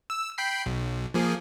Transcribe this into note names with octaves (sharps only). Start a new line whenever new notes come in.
E6
G5 B5 C7
B1
F3 A#3 G#4